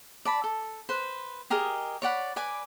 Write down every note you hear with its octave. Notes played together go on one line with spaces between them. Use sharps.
D5 A5 B5
A4
B4 C5
G4 G#4 A#4 D#5
C#5 D5 F#5 B5
B4 D5 G#5 D6